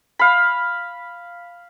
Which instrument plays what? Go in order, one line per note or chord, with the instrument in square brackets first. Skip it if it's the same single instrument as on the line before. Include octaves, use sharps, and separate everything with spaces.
[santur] F5 B5